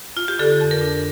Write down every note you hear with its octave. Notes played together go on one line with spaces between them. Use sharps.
F4
G4
D3 A4
F2
A#4
D4